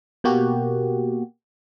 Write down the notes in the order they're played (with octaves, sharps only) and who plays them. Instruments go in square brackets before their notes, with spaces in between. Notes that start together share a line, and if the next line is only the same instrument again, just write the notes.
[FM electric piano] B2 A#3 F#4 G4